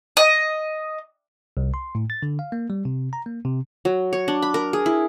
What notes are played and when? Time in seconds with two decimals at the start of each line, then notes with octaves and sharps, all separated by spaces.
0.17 D#5
1.57 C2
1.74 C6
1.95 A2
2.10 A6
2.23 D3
2.39 F5
2.52 A#3
2.70 G3
2.85 C3
3.13 A#5
3.26 A#3
3.45 C3
3.85 F#3
4.13 C#5
4.28 D4
4.42 B5
4.54 A#4
4.73 G#4
4.86 E4